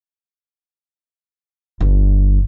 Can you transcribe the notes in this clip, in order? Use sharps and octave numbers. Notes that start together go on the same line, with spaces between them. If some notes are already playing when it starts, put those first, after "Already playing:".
G1